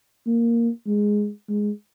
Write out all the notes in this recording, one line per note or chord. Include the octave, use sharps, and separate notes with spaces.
A#3
G#3
G#3